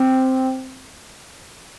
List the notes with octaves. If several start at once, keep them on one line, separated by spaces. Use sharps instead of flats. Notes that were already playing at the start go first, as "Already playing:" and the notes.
Already playing: C4